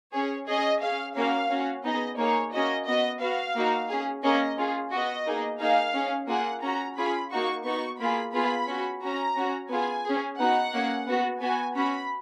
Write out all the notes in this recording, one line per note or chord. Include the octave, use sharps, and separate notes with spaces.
C#4 G#4 C#5
C#4 G#4 D#5
C#4 G#4 F5
A#3 C#4 F#4 F5
C#4 F#4
B3 D#4 G#4 D#5
A#3 D#4 G#4 C#5
A#3 C#4 F#4 D#5
B3 F#4 D#5
B3 F#4 F5
A#3 D#4 F#4
C#4 G#4
A#3 C#4 G#4 D#5
C#4 F4 G#4
B3 F#4 D#5
A#3 D#4 G#4
A#3 D#4 G#4 F5
C#4 G#4
A#3 F4 G#4 F#5
C#4 F#4 A#5
C#4 F4 G#4 B5
A#3 D#4 F#4 C#6
B3 D#4 F#4 C#6
A#3 F4 G#4 B5
B3 F4 G#4 B5
C#4 F#4
C#4 F#4 A#5
C#4 F#4
B3 F4 G#4 G#5
C#4 G#4
B3 D#4 F#4 F#5
A#3 C#4 G#4
B3 F#4
B3 F#4 G#5
C#4 F#4 B5